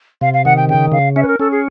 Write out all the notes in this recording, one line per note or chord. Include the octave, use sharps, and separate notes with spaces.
C3 F5
F5
D#3 F#5
G5
C#3 G5
C#3 F5
C#4 E5
B4
A#4
C#4 A4
G#4